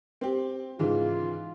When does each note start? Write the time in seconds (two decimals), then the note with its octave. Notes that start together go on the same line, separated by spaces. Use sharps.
0.21 C4 G4
0.79 G#2 C#3 E3 F4